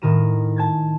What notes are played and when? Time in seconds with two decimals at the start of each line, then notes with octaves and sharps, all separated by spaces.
0.02 A2 D#3 A#4 D#7 E7
0.56 A5 G#6 A6